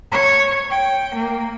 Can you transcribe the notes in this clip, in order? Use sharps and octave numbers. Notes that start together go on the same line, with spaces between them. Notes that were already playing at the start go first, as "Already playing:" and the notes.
C#5
G5
A#3